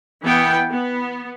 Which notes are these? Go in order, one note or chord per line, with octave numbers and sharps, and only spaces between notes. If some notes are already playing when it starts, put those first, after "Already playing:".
E3 B3 G5
B3